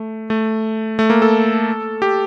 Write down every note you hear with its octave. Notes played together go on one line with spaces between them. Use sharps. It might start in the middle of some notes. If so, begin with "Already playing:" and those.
Already playing: A3
A3
A3
A#3
A4
G4